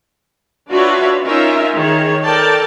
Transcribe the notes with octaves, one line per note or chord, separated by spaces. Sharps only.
D4 F4 F#4 B4 C#5 E5
C#4 D#4 F4 A#4 E5
D#3 G#4 C#5
A4 A#4 D5 G5 A5